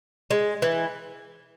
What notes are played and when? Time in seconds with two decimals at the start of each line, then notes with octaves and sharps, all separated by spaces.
0.31 G#3
0.62 E3